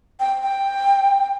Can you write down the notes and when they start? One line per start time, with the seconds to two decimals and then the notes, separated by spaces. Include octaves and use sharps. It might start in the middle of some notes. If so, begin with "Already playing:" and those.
0.20 G5
0.43 G5